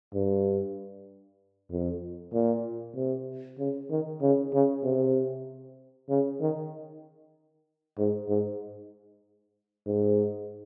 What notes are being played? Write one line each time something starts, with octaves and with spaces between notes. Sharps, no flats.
G2
F2
A#2
C3
C#3
D#3
C#3
C#3
C3
C#3
D#3
G#2
G#2
G#2